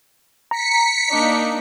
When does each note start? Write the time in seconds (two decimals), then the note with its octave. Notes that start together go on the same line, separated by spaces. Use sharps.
0.51 A#5 B6 C#7
1.09 A#3 D4 D#4